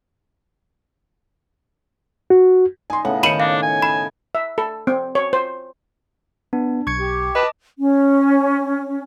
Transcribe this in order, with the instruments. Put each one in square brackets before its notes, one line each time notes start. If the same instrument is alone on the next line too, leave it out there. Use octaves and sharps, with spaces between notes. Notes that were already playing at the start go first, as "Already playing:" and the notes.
[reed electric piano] F#4
[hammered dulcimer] D#4 [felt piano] G#5 C6
[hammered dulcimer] A2 C#3 B3 [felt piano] F#5
[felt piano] D#3 C#7 [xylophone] B5 D#7 F#7
[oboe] D4 [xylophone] F5
[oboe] G#5
[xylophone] B5
[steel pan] E5
A4
C4
C#5
C5
[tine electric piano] B3 [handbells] D4
[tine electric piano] B1 [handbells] C#6 G#6 C#7
[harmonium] G4
[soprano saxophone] B4 [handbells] D#5 A5 D6
[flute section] C#4